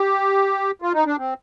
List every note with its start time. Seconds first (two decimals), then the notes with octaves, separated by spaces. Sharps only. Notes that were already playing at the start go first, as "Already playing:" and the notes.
Already playing: G4
0.82 F4
0.94 D#4
1.06 D4
1.18 C4